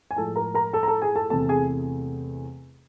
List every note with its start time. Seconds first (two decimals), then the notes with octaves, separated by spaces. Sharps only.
0.11 G#5
0.17 A2 F3 G#3 A4 A5
0.36 A#4 A#5
0.54 A#4 A#5
0.73 A4 A5
0.83 A#5
0.88 A4 A5
1.02 G#4 G#5
1.16 A4 A5
1.30 E2 C3 E3 A3 C4 A4 A5
1.49 G#4 G#5